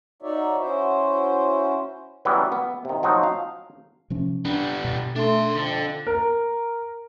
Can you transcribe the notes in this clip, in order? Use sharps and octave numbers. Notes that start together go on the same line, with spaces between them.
D#4 F#4 C#5 D5 E5
C#4 E4 F#4 C5
E3 F#3 G3 B3 C#4
B3
C3 D#3
F3 F#3 D#4
F5
C3 F3 C#4
G3 B3 D4
B2
A3 D4 C6
F2 D3
A#4